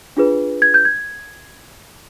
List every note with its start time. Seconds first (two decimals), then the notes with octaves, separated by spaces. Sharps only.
0.17 D4 F4 G#4 B4
0.62 G#6
0.74 G6
0.85 G#6